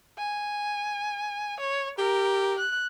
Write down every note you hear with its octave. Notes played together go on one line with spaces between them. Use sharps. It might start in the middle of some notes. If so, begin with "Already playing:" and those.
G#5
C#5
G4 A#4
F#6